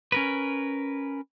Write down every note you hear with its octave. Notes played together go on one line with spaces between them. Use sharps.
C#4 A#4 B4